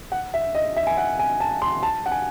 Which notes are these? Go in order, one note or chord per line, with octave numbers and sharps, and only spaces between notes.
F#5
E5
D#5
E5
G#5
F#5
G#5
A5
C6
A5
F#5
G#5